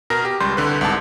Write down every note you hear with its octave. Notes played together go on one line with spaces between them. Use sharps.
B2 A#4 A#6
G4
C#2 G3 C6 G6 C7
C2 D3 B4
C2 G#2 A5